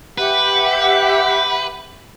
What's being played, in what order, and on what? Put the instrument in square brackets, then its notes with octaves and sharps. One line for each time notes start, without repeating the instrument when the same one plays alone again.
[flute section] G4 E5 F#5 [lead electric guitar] B4